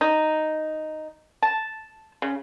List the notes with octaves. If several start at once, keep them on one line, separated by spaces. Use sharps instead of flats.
D#4
A5
C#3